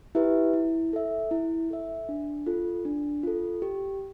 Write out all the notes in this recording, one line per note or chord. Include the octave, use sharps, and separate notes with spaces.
E4 G4 B4 E5
E4
A4 E5
E4
A4 E5
D4
F4 A4
D4
F4 A4
G4